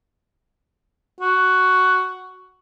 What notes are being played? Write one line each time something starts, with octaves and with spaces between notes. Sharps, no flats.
F#4